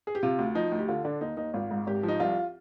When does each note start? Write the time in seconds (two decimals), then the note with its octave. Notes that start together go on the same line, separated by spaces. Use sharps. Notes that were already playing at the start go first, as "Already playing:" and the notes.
0.07 G#4
0.15 G4
0.23 C3 F4
0.39 D2
0.55 F3 D#4
0.72 D2
0.78 G4
0.88 D3 F4
1.05 D3 D4
1.21 D#2 D#4
1.37 D#2 D#4
1.54 G#1 F4
1.71 G#2
1.87 G#1 G4
2.03 F3
2.08 D#4
2.20 C2 F4